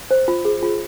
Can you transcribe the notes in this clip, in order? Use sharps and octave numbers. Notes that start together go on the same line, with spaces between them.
C5
F4
G#4
F4